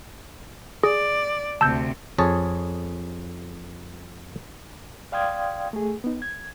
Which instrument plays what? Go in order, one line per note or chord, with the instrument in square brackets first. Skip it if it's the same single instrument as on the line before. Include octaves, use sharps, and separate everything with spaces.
[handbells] G#4 [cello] D5
[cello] D2 C3 [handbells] A5 E6 G6
[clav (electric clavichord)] F2 G#4 C#5 A5
[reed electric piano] D5 F5 G5 C6 D#6 G#6
A3 G#4
B3 D#4
G#6